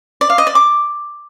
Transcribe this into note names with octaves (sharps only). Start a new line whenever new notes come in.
D5
F5
D#5
D5
D6